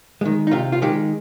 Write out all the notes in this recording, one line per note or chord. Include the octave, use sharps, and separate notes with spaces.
D#3 G#3
D#4
C3 F4
F4
D#3 G#3 G4